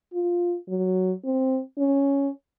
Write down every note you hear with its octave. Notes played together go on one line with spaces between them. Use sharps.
F4
F#3
C4
C#4